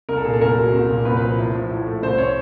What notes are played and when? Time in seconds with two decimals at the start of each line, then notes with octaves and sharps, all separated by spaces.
0.09 C2 A#4
0.17 A4
0.24 A#2 G#4
0.33 A4
0.41 C2 A#4
0.57 F#3
0.73 C2
0.89 A#2
1.05 C2 B4
1.17 F3 B4
1.38 A2
1.55 F3
1.70 A2
1.86 A3
2.02 C2 C5
2.18 C3 C#5